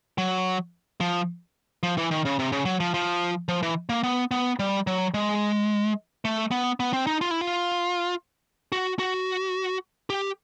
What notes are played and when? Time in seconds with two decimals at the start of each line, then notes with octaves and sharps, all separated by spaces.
0.18 F#3
1.01 F3
1.83 F3
1.98 E3
2.11 D#3
2.25 C#3
2.39 C3
2.52 C#3
2.65 F#3
2.80 F3
2.94 F3
3.49 F3
3.63 E3
3.89 A#3
4.03 B3
4.31 B3
4.59 G3
4.87 F#3
5.14 G#3
6.25 A3
6.51 B3
6.80 B3
6.93 C4
7.07 D#4
7.21 F4
7.31 E4
7.41 F4
8.72 F#4
8.99 F#4
10.10 G4